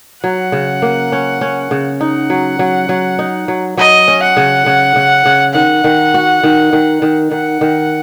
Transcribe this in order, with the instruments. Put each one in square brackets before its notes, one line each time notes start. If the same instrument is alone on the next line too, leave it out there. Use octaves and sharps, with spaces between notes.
[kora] F#3 [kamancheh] F#5
[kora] C#3
A#3
C#4
C#4
C#3
[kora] D#4 [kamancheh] F#5
[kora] F#3
F#3
F#3
D#4
F#3
[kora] F#3 [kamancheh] D#5
[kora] C#4
[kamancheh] F#5
[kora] C#3
C#3
C#3
C#3
[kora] D#3 [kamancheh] F#5
[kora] D#3
F#4
D#3
D#3
D#3
[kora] D#3 [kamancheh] F#5
[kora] D#3